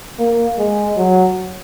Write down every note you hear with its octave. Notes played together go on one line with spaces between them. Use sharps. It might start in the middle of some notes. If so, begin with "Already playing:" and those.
A#3
G#3
F#3